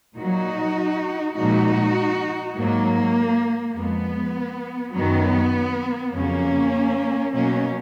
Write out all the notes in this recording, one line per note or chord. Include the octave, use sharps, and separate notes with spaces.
A#2 F#3 D#4 F#4
A#2 F3 G#3 D#4 F#4
G#2 F#3 A#3
F2 F3 G#3 B3
F#2 D#3 F#3 B3
F2 C#3 F#3 A#3 C#4
B2 F#3 A#3 C#4